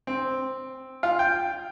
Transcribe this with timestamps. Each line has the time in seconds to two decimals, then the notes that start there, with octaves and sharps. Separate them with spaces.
0.07 C4
1.03 F4
1.19 G5